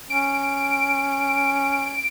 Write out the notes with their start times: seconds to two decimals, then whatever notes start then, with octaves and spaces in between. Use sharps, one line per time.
0.10 C#4 D7